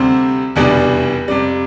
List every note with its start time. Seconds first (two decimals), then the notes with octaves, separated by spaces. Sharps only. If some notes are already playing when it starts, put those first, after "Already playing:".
Already playing: D2 C3 G3 C4 C5
0.56 F1 E2 B2 G3 D4
1.28 F2 C3 G3 D5